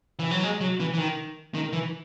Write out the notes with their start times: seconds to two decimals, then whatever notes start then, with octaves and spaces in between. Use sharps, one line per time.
0.19 E3
0.31 F#3
0.43 G#3
0.61 F#3
0.80 E3
0.94 E3
0.99 D#3
1.54 D#3
1.73 E3